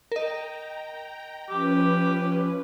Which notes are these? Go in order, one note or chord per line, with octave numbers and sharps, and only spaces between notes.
A#4 D#5 G5 A#5
F3 C#4 G4 B4